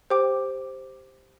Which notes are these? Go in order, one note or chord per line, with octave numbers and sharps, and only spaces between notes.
G4 C5 G5 D6